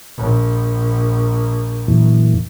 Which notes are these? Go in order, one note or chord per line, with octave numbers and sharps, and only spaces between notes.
A#1
F#2 A#2 E3